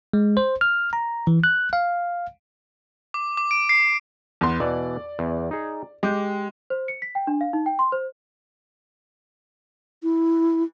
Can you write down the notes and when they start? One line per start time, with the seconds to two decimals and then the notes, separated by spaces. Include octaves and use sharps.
0.13 G#3
0.37 C5
0.61 F6
0.93 A#5
1.27 E3
1.44 F#6
1.73 F5
3.14 D6
3.37 D6
3.51 D7
3.69 C7
4.41 E2 B3 C6
4.60 B2 E3 D5
5.19 E2
5.51 D#4 G#4
6.03 G#3 G4
6.70 C5
6.88 C#7
7.02 B6
7.15 G5
7.27 D4
7.41 F5
7.53 D#4
7.66 G5
7.79 C6
7.92 C5
10.03 E4